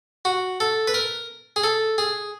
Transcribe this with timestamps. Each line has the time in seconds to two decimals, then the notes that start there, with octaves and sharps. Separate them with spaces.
0.25 F#4
0.60 A4
0.88 B4
0.94 A#4
1.56 G#4
1.64 A4
1.98 G#4